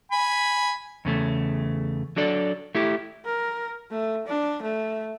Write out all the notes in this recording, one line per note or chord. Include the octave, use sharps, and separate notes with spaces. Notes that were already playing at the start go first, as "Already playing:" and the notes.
G#5 B5
E2 C#3 A3
F#3 D4 A4 D5
A3 E4 G4
A#4
A3
D4
A3